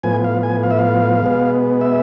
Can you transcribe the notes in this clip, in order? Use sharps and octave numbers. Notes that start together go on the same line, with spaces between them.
A2 F3 B3 G#5
F5
G#5
F5
E5
F5
B2 G#3 B3
E5